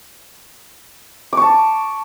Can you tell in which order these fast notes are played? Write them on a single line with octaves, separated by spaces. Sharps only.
D6 C#6 A5